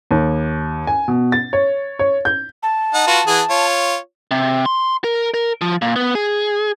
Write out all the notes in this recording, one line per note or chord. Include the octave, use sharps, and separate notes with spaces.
D#2
G#5
B2
A6
C#5
C#5
G6
A5
D#4 F#5
F4 F#4 B4
E3 G#4 F#5
F4 C#5
C3
C6
A#4
A#4
F3
A#2
B3
G#4